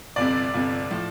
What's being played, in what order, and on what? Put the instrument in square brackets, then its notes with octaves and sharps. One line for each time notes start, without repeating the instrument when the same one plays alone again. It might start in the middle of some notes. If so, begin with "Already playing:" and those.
[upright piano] G1 F2 C3 D5
G1 F2 C3
A2 F3